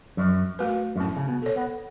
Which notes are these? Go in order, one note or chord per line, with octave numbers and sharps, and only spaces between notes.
F#2 F#3
A3 F#4 B4
F#2
A2 C#4
C#3
B2
A4 C#5
B3